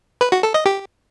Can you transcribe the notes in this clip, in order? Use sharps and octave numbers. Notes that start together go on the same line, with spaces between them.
B4
F#4
A4
D#5
G4